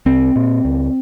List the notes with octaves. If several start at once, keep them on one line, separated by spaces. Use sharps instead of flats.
C2 C4
A#2
C#2